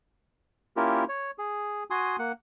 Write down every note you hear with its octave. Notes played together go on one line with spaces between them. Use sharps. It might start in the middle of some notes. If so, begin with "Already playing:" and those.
A#3 C#4 E4 F4 G4 A#4
C#5
G#4
F#4 G#5 C6 D#6
A#3 F#5